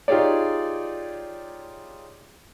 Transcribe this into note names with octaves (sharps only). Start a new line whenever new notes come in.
D#4 F4 G4 G#4 C#5 D5